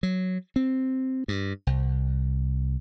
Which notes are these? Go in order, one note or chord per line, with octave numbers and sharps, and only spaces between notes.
F#3
C4
G2
C2